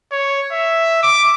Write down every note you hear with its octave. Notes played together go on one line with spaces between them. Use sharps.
C#5
E5
D6